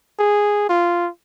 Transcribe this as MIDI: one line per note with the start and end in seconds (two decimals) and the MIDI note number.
0.19 0.67 68
0.69 1.08 65